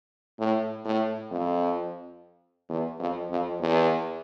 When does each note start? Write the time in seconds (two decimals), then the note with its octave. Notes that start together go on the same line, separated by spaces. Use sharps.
0.39 A2
0.85 A2
1.31 F2
2.69 E2
2.99 F2
3.30 F2
3.60 E2